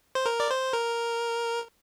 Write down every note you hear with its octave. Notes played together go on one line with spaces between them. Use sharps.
C5
A#4
D5
C5
A#4